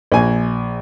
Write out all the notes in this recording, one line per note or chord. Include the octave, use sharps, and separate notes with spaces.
A#1 G#5